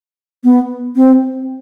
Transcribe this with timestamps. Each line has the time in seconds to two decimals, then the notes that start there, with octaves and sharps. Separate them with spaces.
0.44 B3
0.96 C4